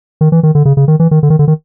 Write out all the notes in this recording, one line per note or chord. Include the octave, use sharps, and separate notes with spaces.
D#3
E3
D#3
D3
C#3
C#3
D#3
E3
D#3
D3
D#3
D3
D#3